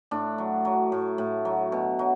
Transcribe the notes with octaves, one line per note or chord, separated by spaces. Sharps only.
A2 D4
F#3
F#3
A2
A2
F#3
B2
F#3